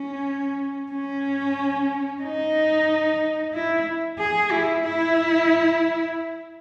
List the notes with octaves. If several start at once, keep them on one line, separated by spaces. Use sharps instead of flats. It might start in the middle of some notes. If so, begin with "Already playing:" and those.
Already playing: C#4
C#4
D#4
E4
G#4
E4
E4